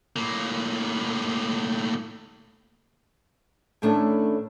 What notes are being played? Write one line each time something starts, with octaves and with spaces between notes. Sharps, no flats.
A2 A#3
A2 D#3 A3 C#4 D4 E4